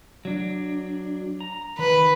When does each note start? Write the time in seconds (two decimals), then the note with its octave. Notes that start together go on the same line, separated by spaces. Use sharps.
0.25 F#3 D4
1.40 A#5
1.79 D#3 B4